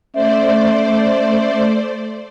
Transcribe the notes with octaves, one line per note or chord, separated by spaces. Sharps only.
A3 C#4 C5 D5 E5